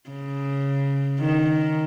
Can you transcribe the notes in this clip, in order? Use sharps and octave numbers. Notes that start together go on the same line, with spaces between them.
C#3
D#3